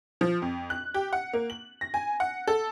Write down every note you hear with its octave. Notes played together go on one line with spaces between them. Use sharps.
F3
F2
F#6
G4
F#5
A#3
F#7
A#6
G#5
F#5
A4